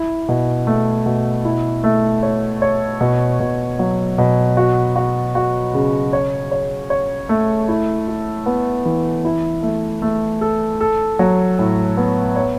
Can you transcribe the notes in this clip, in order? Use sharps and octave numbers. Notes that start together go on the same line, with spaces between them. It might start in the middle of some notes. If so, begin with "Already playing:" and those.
Already playing: E4
B2
A3
B2
E4
A3
C#5
C#5
B2
B2
F#3
B2
F#4
F#4
F#4
C#3
C#5
C#5
C#5
A3
E4
E4
B3
E3
E4
A3
A3
A4
A4
F#3
A2
B3
C#5